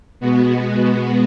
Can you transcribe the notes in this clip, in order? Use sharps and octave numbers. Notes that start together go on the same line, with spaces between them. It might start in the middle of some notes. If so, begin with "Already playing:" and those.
B2 G#3 B3 F#4